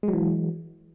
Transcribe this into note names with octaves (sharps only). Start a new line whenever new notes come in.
E3 F#3 G#3